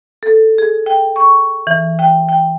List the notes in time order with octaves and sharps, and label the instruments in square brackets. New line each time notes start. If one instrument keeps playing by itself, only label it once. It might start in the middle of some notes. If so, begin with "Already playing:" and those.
[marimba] A4
G#4
G5
C#6
E3
G5
G5